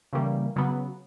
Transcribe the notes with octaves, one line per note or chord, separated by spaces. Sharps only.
C#3 E3 G3 A#3
C#3 F#3 B3